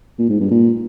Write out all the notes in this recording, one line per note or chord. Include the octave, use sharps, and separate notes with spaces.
A#2
G#2
G2
A#2